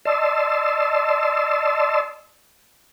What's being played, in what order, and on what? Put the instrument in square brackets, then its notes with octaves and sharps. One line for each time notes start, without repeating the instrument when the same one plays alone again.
[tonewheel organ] D5 D#5 A5 C6 E6